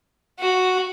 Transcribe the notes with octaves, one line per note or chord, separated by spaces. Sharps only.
F#4